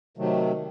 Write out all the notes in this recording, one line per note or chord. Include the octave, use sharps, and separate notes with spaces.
C3 D#3 F#3 A3